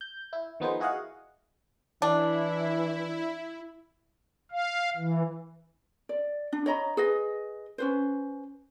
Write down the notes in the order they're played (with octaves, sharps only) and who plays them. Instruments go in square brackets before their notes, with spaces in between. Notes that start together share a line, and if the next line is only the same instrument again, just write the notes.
[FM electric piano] G6
E4
D#3 F3 B3 D#4 G#4 C5
E4 F#4 G#4 D#5 F5 F#5
[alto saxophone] E3 [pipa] D4 [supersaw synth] E4
[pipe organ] F5
E3
[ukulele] D5
D4
C#5 D#5 A#5 B5
G#4 B4 D#5
C#4 B4 C5